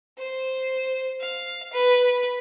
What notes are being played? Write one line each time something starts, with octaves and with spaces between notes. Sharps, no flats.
C5
F5
B4